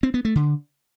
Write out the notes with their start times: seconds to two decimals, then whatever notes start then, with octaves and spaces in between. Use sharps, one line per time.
0.03 C4
0.14 B3
0.25 A3
0.35 D3